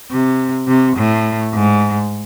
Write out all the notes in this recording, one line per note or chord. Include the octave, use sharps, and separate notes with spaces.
C3
C3
A2
G#2